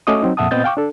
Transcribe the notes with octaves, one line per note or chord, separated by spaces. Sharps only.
A3 C#4 F#4 D#5 D6 D#6
F#3 C4 D#4
F2 A#2 E5 F#5 A5 D#6
A#2 B3 C4 D#5 G6 A6
F5 G5 C#6 D6
D4 A4